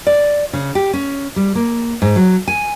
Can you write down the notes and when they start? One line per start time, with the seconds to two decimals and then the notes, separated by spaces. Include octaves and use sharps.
0.07 D5
0.53 C#3
0.75 G4
0.93 C#4
1.36 G3
1.55 A#3
2.02 G#2
2.16 F#3
2.48 G#5